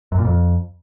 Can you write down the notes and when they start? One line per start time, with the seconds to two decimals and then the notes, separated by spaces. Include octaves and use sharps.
0.12 F#2
0.18 A#2
0.25 F2